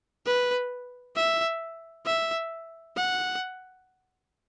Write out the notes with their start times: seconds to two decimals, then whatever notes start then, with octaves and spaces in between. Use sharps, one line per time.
0.26 B4
1.16 E5
2.06 E5
2.96 F#5